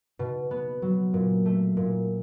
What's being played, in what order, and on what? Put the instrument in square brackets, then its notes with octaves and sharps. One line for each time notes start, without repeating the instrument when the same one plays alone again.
[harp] B2
B3
F#3
A#2
A3
A#2